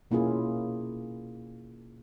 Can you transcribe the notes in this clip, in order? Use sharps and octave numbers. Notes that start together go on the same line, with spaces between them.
B2 A#3 C#4 E4 F4 G#4